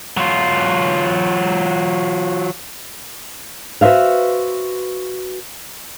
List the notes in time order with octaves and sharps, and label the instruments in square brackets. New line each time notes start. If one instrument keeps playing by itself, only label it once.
[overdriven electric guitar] F#3 F4
[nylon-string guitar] F#4 B4 C5 E5 F5